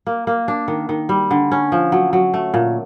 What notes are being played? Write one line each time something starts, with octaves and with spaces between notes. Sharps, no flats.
A#3
A#3
D4
D#3
D#3
G3
D3
C#4
F3
F#3
F#3
A3
A#2